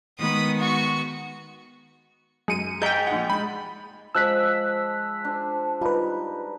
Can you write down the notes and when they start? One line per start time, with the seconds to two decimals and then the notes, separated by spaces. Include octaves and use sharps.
0.18 D#3 G#3 B3 B5 D#6
0.59 F#4 C#6
2.48 F#2 G#3 C#7 D#7
2.82 G#4 D#5 G5 A#5 G6
3.07 A#1 F#5
3.30 G#3 B5
4.15 F3 G#3 E6 F#6 B6
5.25 D4 C5
5.81 G3 D#4 F4 B4